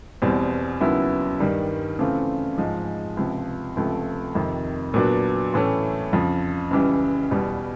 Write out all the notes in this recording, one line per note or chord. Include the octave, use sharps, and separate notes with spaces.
E2 B2 G3 C4
D#2 C#3 F#3 B3 E4
G2 D#3 G3
C#3 E3 A3 C4 F4
G#2 F3 G#3
C#2 C3 F3
C#2 C3 F3 A3
F2 C3 D#3
A#2 F#3 B3 D4 F#4
A2 E3 A3 C#4
F2 C#3 F3
C#2 C#3 E3 G3
E2 B2 G3